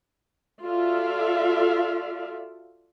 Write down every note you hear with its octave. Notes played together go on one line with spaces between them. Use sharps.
F4 F#4 A4 D5 E5 F5